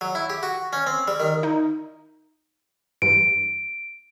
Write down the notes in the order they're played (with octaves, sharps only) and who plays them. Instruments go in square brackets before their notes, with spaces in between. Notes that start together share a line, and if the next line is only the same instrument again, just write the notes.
[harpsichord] F#3
E4
G4
F#4
C#4
C4
G3
D#3
[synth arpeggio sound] D#4
[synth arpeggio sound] E2 G2 [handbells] D7